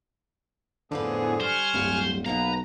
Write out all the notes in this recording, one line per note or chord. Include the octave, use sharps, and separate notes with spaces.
F2 A2 D3 B3 F4 G#4 B4
G3 C5 G#5 C#6 F6
D1 G2 G3
B1 A#3 B3 D#4 B4 A#5